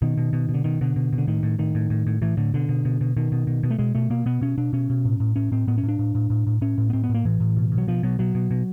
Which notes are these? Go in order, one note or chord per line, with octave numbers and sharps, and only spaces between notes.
B2 D#3
B2
B2
B2
D3
B2 D#3
B2 D3
B2
B2
D3
A2 D#3
A2
A2 D#3
A2
A2
A2
A2 E3
A2 D3
B2 D3
B2
B2
B2
B2 D#3
B2
B2
B2
A3
B2 G#3
B2 A3
B2 A#3
B2 B3
B2 C#4
B2 D4
B2 C#4
B2
A2
A2
A2 C#4
A2 C4
A2 B3
C#4
A2
D4
A2
A2
A2
A2
A2 C#4
A2
B3
A2 C4
B3
A2
A#3
A2 E3
A2
B2
B2
F#3
B2 F3
B2 F#3
B2 F#3
B2
B2